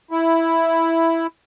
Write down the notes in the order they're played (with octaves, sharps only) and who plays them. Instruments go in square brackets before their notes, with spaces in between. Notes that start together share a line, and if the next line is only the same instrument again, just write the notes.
[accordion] E4